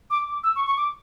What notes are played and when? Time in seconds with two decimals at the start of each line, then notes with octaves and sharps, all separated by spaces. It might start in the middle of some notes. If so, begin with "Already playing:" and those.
0.10 D6
0.28 D6
0.43 E6
0.56 C#6
0.66 C#6
0.77 D6